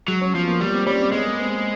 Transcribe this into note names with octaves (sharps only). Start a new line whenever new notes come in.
F#3 G#3
C#4
F3 B3
A#3
G3 B3
C4
G3 C#4
C4
G#3 B3
A#3
B3
C4